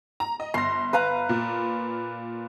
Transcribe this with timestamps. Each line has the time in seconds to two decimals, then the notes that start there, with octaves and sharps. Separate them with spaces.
0.20 A#5
0.40 D#5
0.54 G1 C6 A#6
0.93 B4 F5 A#5
1.29 A#2